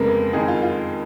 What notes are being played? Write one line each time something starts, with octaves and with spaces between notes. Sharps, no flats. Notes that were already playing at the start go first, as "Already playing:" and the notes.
Already playing: F1 F2 C#3 G#3 A#3 B3 A#4
F#1 F2 D#3 G#3 G#4
F4
F4